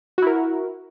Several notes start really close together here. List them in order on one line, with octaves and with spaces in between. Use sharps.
F#4 E4 A#4